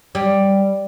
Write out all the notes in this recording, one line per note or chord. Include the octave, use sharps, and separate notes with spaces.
G3